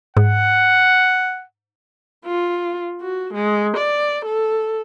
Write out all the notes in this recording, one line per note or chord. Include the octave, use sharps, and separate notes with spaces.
G#2 F#5
F4
F#4
G#3
D5
A4